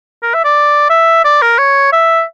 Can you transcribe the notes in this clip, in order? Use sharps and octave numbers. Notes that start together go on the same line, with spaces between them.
A#4
E5
D5
E5
D5
A#4
C#5
E5